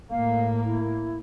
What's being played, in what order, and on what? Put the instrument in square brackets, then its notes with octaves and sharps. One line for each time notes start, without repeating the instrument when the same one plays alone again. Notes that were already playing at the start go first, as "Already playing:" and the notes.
[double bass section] A2 A#3 [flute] F5
[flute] E4